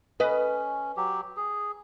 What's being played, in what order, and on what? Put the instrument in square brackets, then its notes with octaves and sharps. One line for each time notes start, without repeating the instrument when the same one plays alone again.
[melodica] C#4 [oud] B4 D#5
[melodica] F#3 G4
G#4